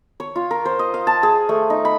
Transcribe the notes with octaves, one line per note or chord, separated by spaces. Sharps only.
C#5
F4
A#4
C5
D#5
F5
A5
G#4
A3
D#4
B5